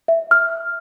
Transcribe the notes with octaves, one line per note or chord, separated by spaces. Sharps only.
E5
F6